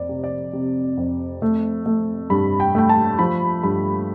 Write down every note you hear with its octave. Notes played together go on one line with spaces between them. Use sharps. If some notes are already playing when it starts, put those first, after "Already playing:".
Already playing: F2 D5
C3
D5
C3
F2
A3
A3
G2 B5
G5
A3 G5
A5
F3 B5
G2 B5